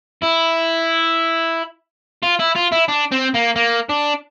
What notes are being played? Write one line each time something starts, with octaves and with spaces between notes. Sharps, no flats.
E4
F4
E4
F4
E4
D4
C4
A#3
A#3
D4